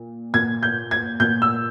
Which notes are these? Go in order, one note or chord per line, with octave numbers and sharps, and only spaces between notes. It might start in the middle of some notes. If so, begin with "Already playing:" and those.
Already playing: A#2
A#2 G#6
G6
G#6
A#2 G6
E6